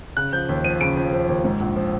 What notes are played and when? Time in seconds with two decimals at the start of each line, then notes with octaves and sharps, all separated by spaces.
0.17 C#3 F#6
0.33 F3 G6
0.49 D#2
0.64 F3 D#7
0.81 C#3 D7
0.97 F3
1.13 F3
1.28 D#2
1.44 G#2
1.61 A#1
1.76 F3